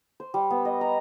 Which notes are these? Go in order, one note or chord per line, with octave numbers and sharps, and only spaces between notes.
C5
G3
B3
D#5
A#5